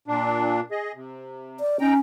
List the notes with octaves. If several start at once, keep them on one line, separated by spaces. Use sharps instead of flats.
A#2 D4
G#4 D#5
C3
D5
C#4 D#4 G5 A#5